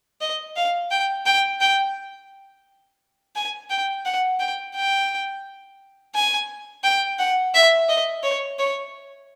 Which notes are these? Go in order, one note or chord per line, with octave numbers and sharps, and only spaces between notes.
D#5
F5
G5
G5
G5
G#5
G5
F#5
G5
G5
G#5
G5
F#5
E5
D#5
C#5
C#5